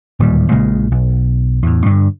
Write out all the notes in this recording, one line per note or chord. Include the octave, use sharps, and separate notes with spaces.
D1 D#2 A#2 G3
A#1 A#2 C#3 G#3
B1
E2 A2
G2 D3